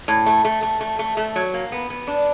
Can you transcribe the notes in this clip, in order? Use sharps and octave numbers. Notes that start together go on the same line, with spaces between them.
A2
A3
A3
A3
A3
A3
A3
F#3
A#3
B3
B3
D4